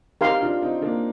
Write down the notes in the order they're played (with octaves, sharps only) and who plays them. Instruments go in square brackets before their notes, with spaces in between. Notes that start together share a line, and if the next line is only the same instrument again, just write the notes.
[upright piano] C4 D#4 [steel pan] G4 A#4 F5 C6
[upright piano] D4 F4
C4 D#4
A#3 D4